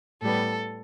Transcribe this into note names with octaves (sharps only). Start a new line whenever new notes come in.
A2 G3 B3 A4